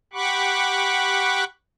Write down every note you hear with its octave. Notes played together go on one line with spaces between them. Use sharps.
G4 F#5 B5 C#6 D6 F#6